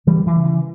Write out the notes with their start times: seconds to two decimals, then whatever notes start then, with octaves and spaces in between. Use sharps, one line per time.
0.06 C#3 E3 G3
0.26 E3
0.35 C#3
0.45 E3